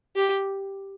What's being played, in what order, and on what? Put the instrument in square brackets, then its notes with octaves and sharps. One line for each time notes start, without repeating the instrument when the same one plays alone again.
[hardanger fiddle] G4